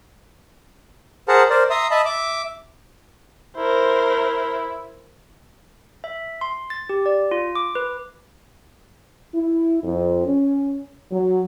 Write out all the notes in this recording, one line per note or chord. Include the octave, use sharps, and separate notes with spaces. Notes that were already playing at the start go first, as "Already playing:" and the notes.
G#4 A#4 C5 F#5 A5 A#5
A#4 C5 D5
E5 A#5 C6 D#6
D#5 E5 A5 B5
E5 D6
E4 A#4 C5
E5
C6
A6
G4
D5
F4
D6
B4
E4
F2
C#4
F#3